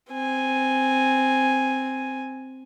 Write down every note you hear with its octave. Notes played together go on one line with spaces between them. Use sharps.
C4 G#5